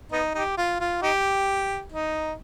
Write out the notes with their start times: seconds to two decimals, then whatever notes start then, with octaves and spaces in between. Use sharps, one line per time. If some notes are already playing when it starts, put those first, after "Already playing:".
0.12 B3 D#4
0.35 D#4 G4
0.57 F4
0.80 F4
1.02 D#4 G4
1.92 D#4